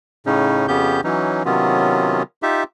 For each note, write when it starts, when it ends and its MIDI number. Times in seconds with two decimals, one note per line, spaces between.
0.26 0.67 45
0.26 0.67 49
0.26 0.67 61
0.26 0.67 63
0.68 1.01 41
0.68 1.01 49
0.68 1.01 59
0.68 1.01 61
0.68 1.01 67
0.68 1.01 91
1.04 1.43 52
1.04 1.43 54
1.04 1.43 61
1.04 1.43 63
1.45 2.23 48
1.45 2.23 51
1.45 2.23 54
1.45 2.23 59
1.45 2.23 61
1.45 2.23 65
2.43 2.64 63
2.43 2.64 65
2.43 2.64 67
2.43 2.64 76